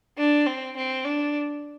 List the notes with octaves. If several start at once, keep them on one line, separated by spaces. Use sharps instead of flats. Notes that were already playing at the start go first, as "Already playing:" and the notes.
D4
C4
C4
D4